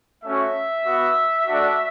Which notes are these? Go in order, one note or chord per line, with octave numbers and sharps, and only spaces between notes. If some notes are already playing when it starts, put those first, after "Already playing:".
A3 C#4 F#4 E5
B3 F#4
A3 D4 F#4